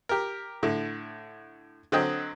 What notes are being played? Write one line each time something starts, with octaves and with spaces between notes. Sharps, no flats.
G4 A#4
A2 D3
D3 F#3 C4 D#5 G5